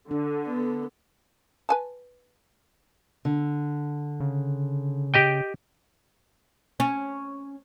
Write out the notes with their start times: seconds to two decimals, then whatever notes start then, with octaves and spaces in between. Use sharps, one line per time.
0.11 D3 D4
0.47 B3
1.69 B4 G#5 A5
3.25 D3
4.20 C#3
5.14 G4 D#5 G5
6.80 C#4